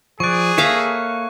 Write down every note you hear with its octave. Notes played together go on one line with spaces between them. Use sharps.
F3 G#4 D5 C#6 F#6
A#3 A4 C#5 E5 F5 A#5